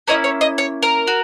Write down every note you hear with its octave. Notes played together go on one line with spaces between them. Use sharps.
A#3 C#4 E4 D#5
C#5
D#5
C#5
A#4
F#4